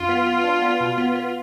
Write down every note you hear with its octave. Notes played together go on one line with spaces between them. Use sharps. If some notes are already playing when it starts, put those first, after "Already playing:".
Already playing: F#2 F4
B3
B3
D4
B3
B2
B3
B3